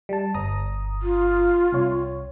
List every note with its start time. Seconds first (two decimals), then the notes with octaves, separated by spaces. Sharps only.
0.09 G3 A5
0.34 G1 A#5 D#6
1.02 F4
1.73 C2 C#5